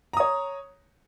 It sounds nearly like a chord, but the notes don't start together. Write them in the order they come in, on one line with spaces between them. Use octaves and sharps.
A#5 D#6 C#5